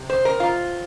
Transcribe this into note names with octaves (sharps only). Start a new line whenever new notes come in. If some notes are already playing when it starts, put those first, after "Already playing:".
Already playing: C3
C5
A#4
F4